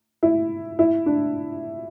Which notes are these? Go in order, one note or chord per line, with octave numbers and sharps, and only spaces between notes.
E4
E4
D4